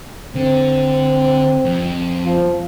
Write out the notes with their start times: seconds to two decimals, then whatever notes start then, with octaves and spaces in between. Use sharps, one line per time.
0.35 D3 C4
1.65 F2
2.25 F3